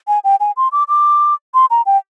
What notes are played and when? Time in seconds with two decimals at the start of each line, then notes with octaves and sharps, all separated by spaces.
0.08 G#5
0.24 G5
0.40 G#5
0.57 C6
0.72 D6
0.88 D6
1.54 C6
1.70 A#5
1.86 G5